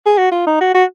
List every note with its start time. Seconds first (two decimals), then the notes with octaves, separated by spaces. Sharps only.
0.06 G#4
0.18 F#4
0.32 F4
0.46 D#4
0.61 F#4
0.74 F#4